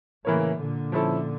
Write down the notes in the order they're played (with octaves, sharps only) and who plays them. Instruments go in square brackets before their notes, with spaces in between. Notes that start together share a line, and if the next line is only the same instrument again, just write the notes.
[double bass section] A2 C#3 [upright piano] E3 A#3 E4 A#4 C#5
[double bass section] A#2 D3
[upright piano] F3 C#4 E4 A4